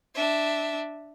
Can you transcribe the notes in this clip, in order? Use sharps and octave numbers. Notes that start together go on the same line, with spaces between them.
D4 E5